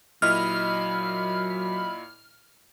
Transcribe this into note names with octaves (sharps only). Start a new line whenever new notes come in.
A#2 F#3 E4 D#5 B5 F6